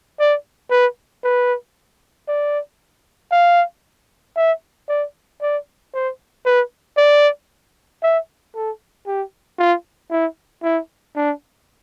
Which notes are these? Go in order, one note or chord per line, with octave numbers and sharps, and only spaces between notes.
D5
B4
B4
D5
F5
E5
D5
D5
C5
B4
D5
E5
A4
G4
F4
E4
E4
D4